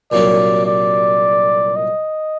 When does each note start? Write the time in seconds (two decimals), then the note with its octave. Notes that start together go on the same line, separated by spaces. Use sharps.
0.12 C2 A#2 F#3 A#3 D4 D5
0.66 D5
1.76 D#5